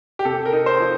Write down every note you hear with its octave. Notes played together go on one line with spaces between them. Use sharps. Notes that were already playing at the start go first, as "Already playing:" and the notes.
G4
C3 A4
A#4
D#4
C5
F3